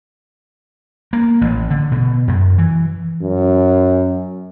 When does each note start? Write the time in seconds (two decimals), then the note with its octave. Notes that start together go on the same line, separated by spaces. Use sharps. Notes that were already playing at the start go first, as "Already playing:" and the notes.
1.13 A#3
1.41 A1
1.70 D3
1.92 B2
2.28 F#2
2.58 E3
3.22 F#2